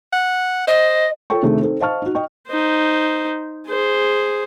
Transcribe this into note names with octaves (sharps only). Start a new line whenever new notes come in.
F#5
C5 D#5
F4 A4 C#5 G5 C#6
C3 D#3 A3 D4 G#4
C4 D#4 A4
C5 D#5 F5 A5 C#6 F6
D#4 F#4
D#5 G5 C#6
D#4 C5
G#4 C5